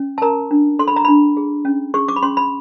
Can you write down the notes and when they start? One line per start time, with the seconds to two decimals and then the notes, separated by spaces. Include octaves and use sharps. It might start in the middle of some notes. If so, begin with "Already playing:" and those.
Already playing: C#4
0.18 A5
0.22 A#4 A#5
0.51 D4
0.79 A4 C6
0.88 B5
0.96 A#5
1.05 D4 B5
1.37 G#4
1.65 C#4
1.94 G#4 C#6
2.08 D6
2.16 B5
2.23 C#4 C6
2.37 B5